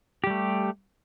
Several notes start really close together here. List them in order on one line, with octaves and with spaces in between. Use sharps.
G4 G3 A3